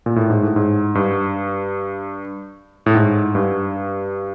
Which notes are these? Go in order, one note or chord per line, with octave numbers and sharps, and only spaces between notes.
A#2
A2
G#2
A2
G#2
G2
A2
G#2
G2